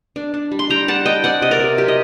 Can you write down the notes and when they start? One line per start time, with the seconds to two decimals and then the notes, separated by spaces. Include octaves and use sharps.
0.16 D4
0.34 D4
0.52 G3
0.59 C6
0.70 G3 G5 A#5
0.88 G3 F#5 A5
1.06 D4 D#5 G5
1.24 C4 D5 F#5
1.42 C3 D#5
1.51 A#4 D5
1.60 C3
1.77 F#3 G4
1.88 D#5